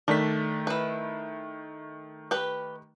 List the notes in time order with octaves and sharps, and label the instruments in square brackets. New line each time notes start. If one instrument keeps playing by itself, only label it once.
[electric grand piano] D#3 A3 B6 [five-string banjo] D4
[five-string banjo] E4 B4
G4 B4